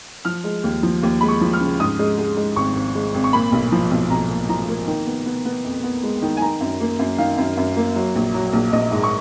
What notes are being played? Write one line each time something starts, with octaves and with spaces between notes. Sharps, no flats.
F3 F6
G#3
D#2
F3
D#2
G#3 B5
C#6
F3
F6
C#3
G#2 D#6
G#3
G#3
G#3
G#1 C#6
G#1
G#3
G#1
C#6
A#2 B5
B1
F3
B1
B1 A#5
A#2
F3 A#5
A#3
D#3
B3
B3
B3
F2
B3
G#3
D#3
G#5
D#3 A#5
F#2
A#3
F#2
D#3 F5
F#2
F#2
A#3
F#3
A#1
F#3
A#1
A#1 D#5
G#2
C#6